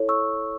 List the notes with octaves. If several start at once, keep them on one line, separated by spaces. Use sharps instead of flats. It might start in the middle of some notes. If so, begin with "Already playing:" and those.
Already playing: E4 A4 C#5
C#6 E6